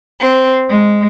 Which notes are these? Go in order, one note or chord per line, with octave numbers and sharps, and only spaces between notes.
C4
G#3